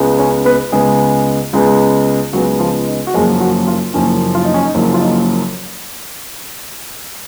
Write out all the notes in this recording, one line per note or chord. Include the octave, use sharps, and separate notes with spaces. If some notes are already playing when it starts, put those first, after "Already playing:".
Already playing: C#2 C#3 G#3 B3
C#4 C#5
B3 B4
C#2 C#3 G#3 B3 G#4
C#2 C#3 G#3 B3
C#2 C#3 F#3 G#3 B3 F#4
F3 F4
D#4
F#4
F#1 F#2 F3 G#3 A#3 G#4
F#3 F#4
F3 F4
F#1 F#2 F3 A#3 C#4
F4
D#4
C#4
D#4
F#1 F#2 F3 A#3
F4
D#4